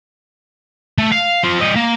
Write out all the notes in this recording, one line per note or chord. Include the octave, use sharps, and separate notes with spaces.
A3
F5
C4 F4
G3 D#5
A#3